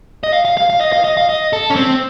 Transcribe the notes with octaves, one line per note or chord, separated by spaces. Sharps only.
D#5
F5
F5
F5
F5
D#5
F5
D#5
F5
D#5
A4
C#4
C4